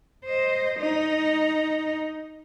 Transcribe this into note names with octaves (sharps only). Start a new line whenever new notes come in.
C5 D#5
D#4